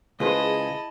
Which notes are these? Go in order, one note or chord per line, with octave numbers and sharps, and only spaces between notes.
C#2 E4 G#4 B4 C5 D#5 A5